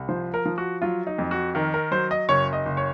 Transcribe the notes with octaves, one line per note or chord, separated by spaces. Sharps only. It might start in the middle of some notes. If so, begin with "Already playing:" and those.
Already playing: C2
F3 C5
A#4
F3
F#4
F#3 F4
D#4
F2
F#4
D#3 A#4
A#4
F#3 C5
D#5
F#1 C#5
D#5
F#1
C#5